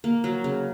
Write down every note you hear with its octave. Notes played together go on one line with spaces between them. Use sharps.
A#3
F#3
C#3